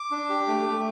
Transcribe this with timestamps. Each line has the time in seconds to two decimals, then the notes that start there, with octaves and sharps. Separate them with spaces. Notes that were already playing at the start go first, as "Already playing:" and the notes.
Already playing: D6
0.11 D4
0.30 G4
0.47 A3
0.66 A3